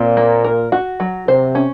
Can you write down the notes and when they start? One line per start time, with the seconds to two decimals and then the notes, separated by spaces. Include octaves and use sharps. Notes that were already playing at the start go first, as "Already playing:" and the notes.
Already playing: A#2 C4
0.17 A#3
0.44 A#4
0.72 F#4
1.00 F#3
1.28 C3 C5
1.55 C#4